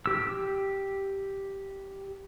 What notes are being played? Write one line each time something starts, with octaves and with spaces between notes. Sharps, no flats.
G4 E6